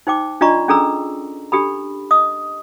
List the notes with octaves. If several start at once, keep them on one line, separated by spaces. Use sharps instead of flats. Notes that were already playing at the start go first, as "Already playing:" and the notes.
D#4 C5 G5 D6
D4 F4 D5 D#5 A#5 C#6
C#4 D4 G#4 A4 A#5 E6
D4 G4 A4 B5
D#5 D#6